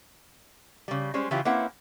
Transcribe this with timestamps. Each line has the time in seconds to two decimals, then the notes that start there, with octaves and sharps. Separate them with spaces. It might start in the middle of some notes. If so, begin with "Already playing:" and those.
0.88 C#3 G3
1.14 G3 G#3 C#4 C5
1.31 C#3 E3 C#4 E4 F4 G4
1.45 A#3 C4 C#4 E4 B4 F#5